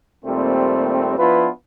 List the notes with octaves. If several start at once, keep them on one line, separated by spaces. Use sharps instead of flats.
D#2 A#2 G3 A3 C4
F3 B3 D4 E4 F4 B4